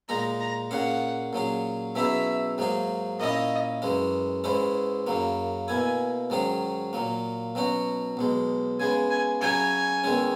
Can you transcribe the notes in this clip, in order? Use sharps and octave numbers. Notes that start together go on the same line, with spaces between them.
A#2 G#3 D#4 A#5
A#5
A#2 A#3 C#4 G#4 F#5
A#2 F#3 C#4 G#4
B2 F#3 C#4 E4 G#4 E5
G#2 F#3 A#3 D#4 G#4
A#2 A#3 C#4 E4 D#5
F#2 E3 G#3 C#4
G#2 E3 G#3 C#4 E4
F#2 C#3 F#3 A#3
B2 A#3 E4 G#5
G#2 D#3 F#3 C#4 G#4
A#2 F#3 A#3
B2 F#3 C#4 F#4
B1 B2 G#3
C#3 G#3 B3 G#5
G#5
C#3 F#3 C#4 F#4 G#5
E2 D#3 G#3 C#4